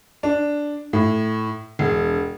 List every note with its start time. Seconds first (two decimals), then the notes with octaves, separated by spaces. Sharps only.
0.23 D4
0.93 A2
1.79 E1